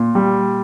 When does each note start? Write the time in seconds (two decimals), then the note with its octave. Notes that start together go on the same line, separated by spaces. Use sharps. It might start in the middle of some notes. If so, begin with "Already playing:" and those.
Already playing: A#2
0.15 G3